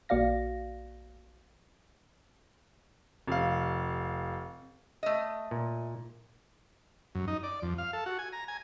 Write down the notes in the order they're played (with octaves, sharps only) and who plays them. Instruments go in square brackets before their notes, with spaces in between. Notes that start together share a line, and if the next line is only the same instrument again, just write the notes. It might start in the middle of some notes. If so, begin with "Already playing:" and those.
[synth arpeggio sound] A#1 A#3 F#4 D5 F5 A#6
[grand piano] F1 F5
[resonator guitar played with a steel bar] A3 D#5
[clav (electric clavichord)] A#2
[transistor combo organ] F#2
D#4
D5
F2
F5
A4
F#4
G#5
A#5
G#5